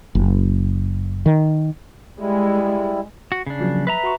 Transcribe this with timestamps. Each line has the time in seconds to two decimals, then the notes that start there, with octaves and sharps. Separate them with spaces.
0.15 F#1
1.26 D#3
2.18 G3 G#3 E4
3.32 F#4
3.46 C#3 D4
3.60 F3 F#3 A#3
3.87 B4 E5 A#5
4.03 F#4 C6 C#6